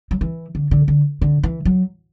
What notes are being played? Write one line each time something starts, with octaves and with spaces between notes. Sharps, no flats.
F#3
E3
D3
D3
D3
D3
E3
F#3